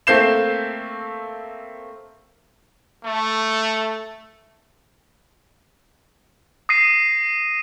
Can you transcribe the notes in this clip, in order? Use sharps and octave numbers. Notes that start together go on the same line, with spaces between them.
A3 A#3 C4 G6 C7 E7
A3
D#6 A#6 C7 D#7